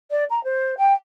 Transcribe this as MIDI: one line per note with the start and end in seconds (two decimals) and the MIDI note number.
0.11 0.24 74
0.30 0.42 82
0.44 0.75 72
0.77 0.93 79